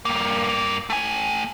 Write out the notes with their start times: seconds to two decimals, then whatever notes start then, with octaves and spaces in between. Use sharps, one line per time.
0.05 G2 A#3
0.90 A3 G#5